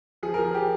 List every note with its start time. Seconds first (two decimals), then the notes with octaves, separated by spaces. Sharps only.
0.23 F3 G#4
0.34 A#4
0.38 F3
0.44 G#4
0.54 G4